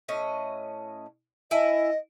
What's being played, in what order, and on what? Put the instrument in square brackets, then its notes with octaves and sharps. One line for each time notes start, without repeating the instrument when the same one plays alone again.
[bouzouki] A2 C#4 D#5
[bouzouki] E4 G#5 [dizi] D#5